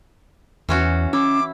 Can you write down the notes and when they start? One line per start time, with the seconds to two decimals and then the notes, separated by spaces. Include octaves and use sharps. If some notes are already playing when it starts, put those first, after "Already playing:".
0.69 E2 E3 C#4 F#4
1.13 C#4 E4 D6